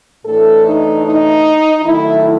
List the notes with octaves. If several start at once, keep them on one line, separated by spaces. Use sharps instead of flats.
A2 E3 A3 D4 A4
D#4
D#4
D#3 F#3 A3 E4